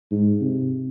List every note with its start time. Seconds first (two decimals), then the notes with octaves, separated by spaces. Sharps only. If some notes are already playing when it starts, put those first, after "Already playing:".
0.11 G#2
0.41 C3